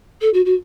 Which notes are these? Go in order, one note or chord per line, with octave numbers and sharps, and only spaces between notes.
A4
F#4
F#4